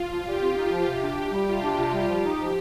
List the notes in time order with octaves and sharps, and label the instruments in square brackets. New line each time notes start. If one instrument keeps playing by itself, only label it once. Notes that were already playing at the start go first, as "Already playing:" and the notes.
Already playing: [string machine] F4
[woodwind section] F3
[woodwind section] A#2 [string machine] G4
[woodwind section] C4
D#4
F3
[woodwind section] C3 [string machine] G4
[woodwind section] D4
C3
G3
[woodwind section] C3 [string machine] F4
[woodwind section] D4
[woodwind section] C3 [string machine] F4
[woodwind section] G3
[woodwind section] F3 [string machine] G4
[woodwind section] D#4
F3